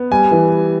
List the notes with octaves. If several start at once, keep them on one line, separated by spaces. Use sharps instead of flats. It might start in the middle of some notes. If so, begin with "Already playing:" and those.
Already playing: B3
G3 G#5
E3